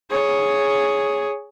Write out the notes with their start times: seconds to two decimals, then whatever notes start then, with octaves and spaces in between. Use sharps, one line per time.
0.11 G#4 C#5